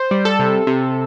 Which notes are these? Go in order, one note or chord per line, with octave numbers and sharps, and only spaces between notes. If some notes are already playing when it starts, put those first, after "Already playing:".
Already playing: C5
G3
A4
C3
C3